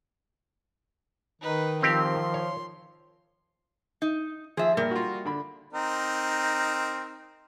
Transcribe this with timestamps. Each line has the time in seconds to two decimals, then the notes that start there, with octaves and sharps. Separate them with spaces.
1.42 D#3 D#4 B4
1.83 F3 C4 G4 C6
2.34 C#5
4.02 D#4
4.57 F3 F4 G#4 E5
4.77 A#2 G3 A#4
4.91 F4 F#4
5.25 D3 B5
5.73 C4 D#4 A#4